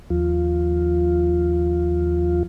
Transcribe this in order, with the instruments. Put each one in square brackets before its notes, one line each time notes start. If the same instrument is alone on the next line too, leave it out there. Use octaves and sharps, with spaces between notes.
[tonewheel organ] D#2 F3 F4